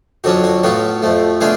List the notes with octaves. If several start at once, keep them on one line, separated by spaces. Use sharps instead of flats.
F2 D3 F#3 C#4 F#4
F#4
A2 F#3 B3 F4 F#4
F2 F3 A3
B2 A3 D4 F4 G#4